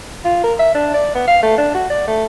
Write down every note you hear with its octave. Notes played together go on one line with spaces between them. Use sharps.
F4
A#4
E5
D4
D5
B3
F5
A3
D4
F#4
D5
A3